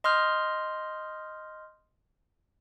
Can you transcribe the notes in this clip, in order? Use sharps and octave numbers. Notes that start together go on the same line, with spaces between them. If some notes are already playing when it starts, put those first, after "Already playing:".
D#5 C6 D#6 F6 G6